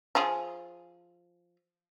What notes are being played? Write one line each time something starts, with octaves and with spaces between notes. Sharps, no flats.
F3 F4 G#4